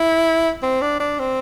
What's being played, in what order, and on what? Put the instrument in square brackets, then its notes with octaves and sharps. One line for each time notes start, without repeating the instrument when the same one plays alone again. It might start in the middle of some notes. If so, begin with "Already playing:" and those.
Already playing: [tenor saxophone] E4
C4
D4
D4
C4